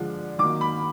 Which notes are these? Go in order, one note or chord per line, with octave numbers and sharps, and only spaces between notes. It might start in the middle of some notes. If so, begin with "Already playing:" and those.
Already playing: D3 F3 G#3 D4
D#3 F#3 A#3 D6
B5